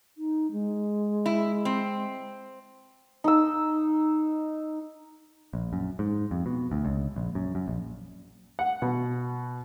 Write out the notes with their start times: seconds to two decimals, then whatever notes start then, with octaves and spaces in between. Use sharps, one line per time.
0.17 D#4
0.51 G#3
1.26 E4
1.65 C4
3.24 D#4 E6
5.53 A#1
5.73 F#2
5.99 G#2
6.31 F2
6.46 B2
6.71 D2
6.85 C#2
7.16 A#1
7.35 F#2
7.55 F#2
7.68 A#1
8.59 F#5
8.82 B2